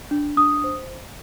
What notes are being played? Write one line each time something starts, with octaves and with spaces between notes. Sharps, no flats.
D4
D4 D#6
C5